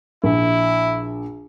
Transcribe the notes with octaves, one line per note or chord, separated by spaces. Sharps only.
A#1 E4